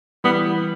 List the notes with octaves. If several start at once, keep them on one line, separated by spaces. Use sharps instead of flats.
E3 G3 B3